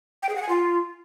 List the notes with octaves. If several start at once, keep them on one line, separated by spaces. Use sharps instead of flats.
G5
G#4
F#5
G#5
F4